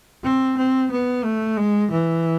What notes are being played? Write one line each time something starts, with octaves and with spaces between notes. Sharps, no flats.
C4
C4
B3
A3
G#3
E3